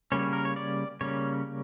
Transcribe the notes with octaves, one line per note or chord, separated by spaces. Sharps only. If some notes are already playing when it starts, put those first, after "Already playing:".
C#3 G3 A#3 C#4 C#5
A#4
C#5
D5
C#3 G3 A#3 C#4 C#5